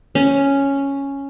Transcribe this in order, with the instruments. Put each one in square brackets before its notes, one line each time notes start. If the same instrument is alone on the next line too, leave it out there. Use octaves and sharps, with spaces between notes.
[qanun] C#4